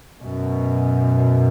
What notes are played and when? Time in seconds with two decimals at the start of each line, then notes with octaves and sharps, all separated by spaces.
0.20 F#2 B2